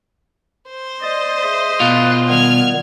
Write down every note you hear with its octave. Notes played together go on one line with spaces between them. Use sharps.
C5
D5 D#5
G#4 E5
B2 F4 F5 F#6 A6
D#3 G3 B3 F6 G#6